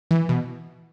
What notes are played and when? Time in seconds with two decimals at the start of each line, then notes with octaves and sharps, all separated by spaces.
0.11 E3
0.29 B2